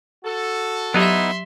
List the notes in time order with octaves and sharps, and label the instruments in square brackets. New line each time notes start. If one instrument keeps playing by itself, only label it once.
[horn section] F#4 A4
[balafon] F#3 G4 [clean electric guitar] B3 D#4 E4 [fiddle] E5 C6